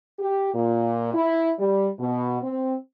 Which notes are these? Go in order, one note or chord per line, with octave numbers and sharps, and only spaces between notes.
G4
A#2
E4
G3
B2
C4